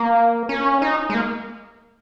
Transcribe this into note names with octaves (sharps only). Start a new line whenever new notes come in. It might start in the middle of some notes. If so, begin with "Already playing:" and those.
Already playing: A#3
C#4
D#4
G#3
A#3